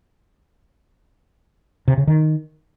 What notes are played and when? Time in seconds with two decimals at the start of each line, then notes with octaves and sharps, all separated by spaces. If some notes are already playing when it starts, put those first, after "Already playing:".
1.88 C3
1.98 C#3
2.07 D#3